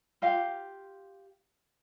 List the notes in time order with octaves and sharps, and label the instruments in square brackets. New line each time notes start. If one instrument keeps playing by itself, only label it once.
[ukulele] F4 G4 F5